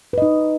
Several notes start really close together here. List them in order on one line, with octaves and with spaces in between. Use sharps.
B4 D#5 D#4